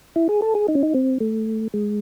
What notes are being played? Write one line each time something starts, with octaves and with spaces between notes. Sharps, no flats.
E4
G#4
A4
G#4
D#4
C#4
D#4
C4
A3
G#3